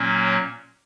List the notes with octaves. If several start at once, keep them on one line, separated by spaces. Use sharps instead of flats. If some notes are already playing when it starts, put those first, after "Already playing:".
Already playing: A#2 F#3 A#3 C#4
C#5